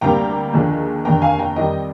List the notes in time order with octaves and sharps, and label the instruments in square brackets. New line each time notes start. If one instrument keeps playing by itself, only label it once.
[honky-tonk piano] D2 C3 G3 A#3 G5 A#5
D#2 D3 F3 G#3
F1 D#2 D3 G5 A#5
F5 G#5
G5 A#5
F2 D#3 G3 C4 D#4 D#5 G5